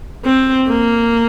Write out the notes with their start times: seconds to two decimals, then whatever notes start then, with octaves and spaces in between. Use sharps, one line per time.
0.25 C4
0.68 A#3